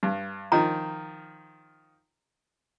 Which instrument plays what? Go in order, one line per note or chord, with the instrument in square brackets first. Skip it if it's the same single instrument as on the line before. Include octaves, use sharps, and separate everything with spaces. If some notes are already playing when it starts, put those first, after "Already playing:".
[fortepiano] G2
[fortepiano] D#3 F3 [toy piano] A#5